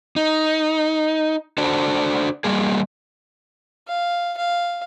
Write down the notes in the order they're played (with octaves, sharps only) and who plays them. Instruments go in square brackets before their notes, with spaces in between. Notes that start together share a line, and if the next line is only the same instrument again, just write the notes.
[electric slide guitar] D#4
D4 F#4 A4 C5 D5
G3 A#3 G#4
[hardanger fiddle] F5
F5